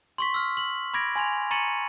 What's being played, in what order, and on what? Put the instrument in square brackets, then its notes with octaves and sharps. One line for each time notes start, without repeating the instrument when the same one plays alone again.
[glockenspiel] C6 C#6 B6
E6 F6
F#7
B5 D6 G#6 A#6 D7
G#5 C6 G#6 F7
A#5 C#6 A6 C#7 D#7 F#7